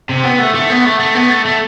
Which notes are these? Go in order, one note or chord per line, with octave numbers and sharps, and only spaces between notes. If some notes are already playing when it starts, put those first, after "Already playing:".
C3
B3
A3
A3
B3
A3
A3
B3
A3
A3